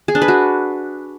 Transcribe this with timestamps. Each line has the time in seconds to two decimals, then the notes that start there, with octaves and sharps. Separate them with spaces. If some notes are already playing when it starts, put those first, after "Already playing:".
0.08 G#4
0.15 D4
0.22 B4
0.28 F#4